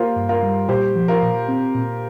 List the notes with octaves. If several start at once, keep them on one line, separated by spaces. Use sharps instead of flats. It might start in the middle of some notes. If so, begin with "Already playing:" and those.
Already playing: A#3 F4 G4 A#4 C5
G2
F4 A#4
G3
A#2 G4 C5
F3
F4 A#4
A#2
C4
A#2